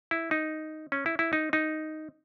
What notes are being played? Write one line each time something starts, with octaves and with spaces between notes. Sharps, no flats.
E4
D#4
C#4
E4
E4
D#4
D#4